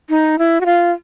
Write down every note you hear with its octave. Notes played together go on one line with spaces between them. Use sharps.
D#4
E4
F#4
F4